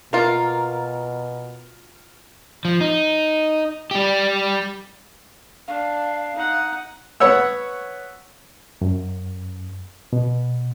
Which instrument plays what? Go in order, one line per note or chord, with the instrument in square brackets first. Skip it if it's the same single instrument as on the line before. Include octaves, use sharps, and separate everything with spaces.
[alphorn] B2 [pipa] A#3 F4 [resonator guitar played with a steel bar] A#4
[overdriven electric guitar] F3
D#4
G3 G4
[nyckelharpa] D4 [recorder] F5
[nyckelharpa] D#4 F#5
[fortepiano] B3 C#5 F#5 E6
[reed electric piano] F#2
B2